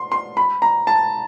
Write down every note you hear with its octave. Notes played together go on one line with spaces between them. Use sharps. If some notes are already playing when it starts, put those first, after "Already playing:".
Already playing: C6
C6
B5
A#5
A5